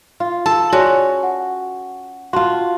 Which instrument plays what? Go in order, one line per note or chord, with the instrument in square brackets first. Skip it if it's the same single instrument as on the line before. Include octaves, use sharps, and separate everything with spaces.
[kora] F4
[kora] A4 [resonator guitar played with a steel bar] A5
[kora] C#4 [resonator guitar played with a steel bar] F#4 [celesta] G#4 D5 C6
[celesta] F#5
[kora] F4 F#4 [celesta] F5 A5 C6